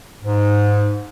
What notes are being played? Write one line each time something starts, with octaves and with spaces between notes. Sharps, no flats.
G#2